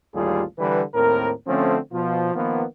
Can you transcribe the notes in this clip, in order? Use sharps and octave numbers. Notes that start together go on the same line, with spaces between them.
A1 D#2 G3 F4 G#4 A4
D3 E3 G3 B4
D#2 A2 C4 A#4
D3 F3 A3 C4 C#4
B2 F3 F4
D#3 F3 A#3 B3